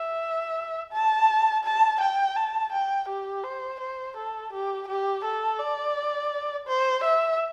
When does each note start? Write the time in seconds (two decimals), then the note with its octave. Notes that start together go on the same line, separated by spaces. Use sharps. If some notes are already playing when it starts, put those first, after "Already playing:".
Already playing: E5
0.93 A5
1.64 A5
2.01 G5
2.36 A5
2.72 G5
3.09 G4
3.44 C5
3.80 C5
4.16 A4
4.52 G4
4.88 G4
5.24 A4
5.59 D5
6.67 C5
7.04 E5